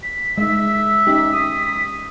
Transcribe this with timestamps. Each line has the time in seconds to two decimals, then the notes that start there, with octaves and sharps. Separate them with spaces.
0.03 B6
0.38 G#3 D#4 E5
1.07 C#4 D#4 G4 B6
1.33 D#6